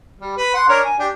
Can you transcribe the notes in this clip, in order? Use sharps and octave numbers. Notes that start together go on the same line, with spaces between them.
G3
B4
F#5 C6
D4 A#4 C#5
G#5
D4 G4